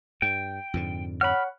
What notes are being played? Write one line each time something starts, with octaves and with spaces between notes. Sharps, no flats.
G2 G5
F2 G#2 D3
C#5 F#5 B5 F6